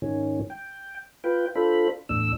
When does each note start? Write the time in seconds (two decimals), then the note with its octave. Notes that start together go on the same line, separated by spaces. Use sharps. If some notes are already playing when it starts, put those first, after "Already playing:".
0.02 G#2 D#3 C#4
0.50 G5
1.24 F4 B4 G5
1.55 D4 F4 A4 C5 B5
2.09 E2 A2 D4 E6